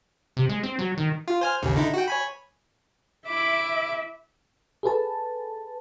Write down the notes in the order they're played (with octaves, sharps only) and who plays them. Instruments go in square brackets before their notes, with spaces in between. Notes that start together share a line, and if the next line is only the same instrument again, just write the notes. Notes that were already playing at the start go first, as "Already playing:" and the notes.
[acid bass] C3
G#3
C4
F#3
D#3
[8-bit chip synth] F4
C5 G#5 F6
A1 D#2 C#3
D3 D#4 E4
F#4 G5
C#5 G#5 B5
[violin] E4 D6 [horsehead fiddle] E5
[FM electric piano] G#4 A4 B4 A5